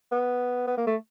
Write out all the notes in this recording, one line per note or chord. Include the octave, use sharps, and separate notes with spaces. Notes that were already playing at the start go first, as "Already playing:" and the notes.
B3
B3
A#3
A3